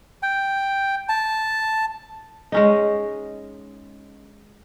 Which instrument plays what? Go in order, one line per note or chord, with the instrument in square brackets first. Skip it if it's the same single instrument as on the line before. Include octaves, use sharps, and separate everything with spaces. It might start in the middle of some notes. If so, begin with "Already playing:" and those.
[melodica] G5
A5
[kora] G#3 C#4 D#4